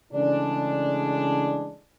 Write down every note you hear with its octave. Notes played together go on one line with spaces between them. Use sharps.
C#3 E3 G#3 A3 D4